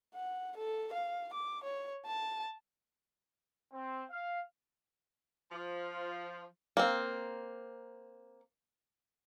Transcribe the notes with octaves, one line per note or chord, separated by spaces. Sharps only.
F#5
A4
F5
D6
C#5
A5
C4
F5
F3
A#3 C4